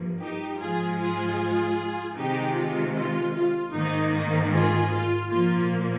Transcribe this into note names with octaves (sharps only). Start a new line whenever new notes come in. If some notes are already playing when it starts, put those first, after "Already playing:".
Already playing: G2 F3 A#3
D#4 G4
G#2 F3 G#3 F4 G#4
F4 G#4
C3 D#3 G#3 D#4 G4
F4
F4
F4
G#2 D#3 A#3 D#4
D#4
F4 G#4
F4
A#2 F3 A#3 F4